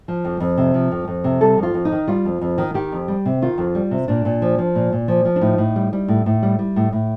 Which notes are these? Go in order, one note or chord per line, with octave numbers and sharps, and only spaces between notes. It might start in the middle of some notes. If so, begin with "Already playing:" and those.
F3
F2
F2
C3
F3
F2
F2
C3
G3 A4
F2
F4
F2
D#4
D#3
G3 F4
F2
F2
D#3
D#3 G4
F2
G3
C3
D#3 F4
F2
G3
C3
A#2 D4
A#2
F3
F3
A#2
A#2
F3
F3
D4
A2 D#4
A2
G3
G3
A2
A2
G3
G3
A2
A2